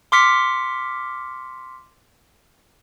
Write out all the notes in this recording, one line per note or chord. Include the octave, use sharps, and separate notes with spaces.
C6 D6 F6 B6 C#7